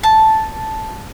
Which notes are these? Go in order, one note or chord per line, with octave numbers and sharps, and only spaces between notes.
A5